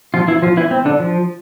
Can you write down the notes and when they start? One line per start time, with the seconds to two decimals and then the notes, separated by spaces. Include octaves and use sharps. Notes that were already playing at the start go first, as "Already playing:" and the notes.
0.14 F3 F4
0.28 E3 E4
0.42 F3 F4
0.57 E3 E4
0.71 C4
0.85 D3 D4
1.00 F3